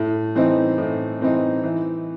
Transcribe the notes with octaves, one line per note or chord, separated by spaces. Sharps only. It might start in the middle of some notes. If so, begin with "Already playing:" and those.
Already playing: A2
E3 C4 D#4
A2
E3 C4 D#4
E3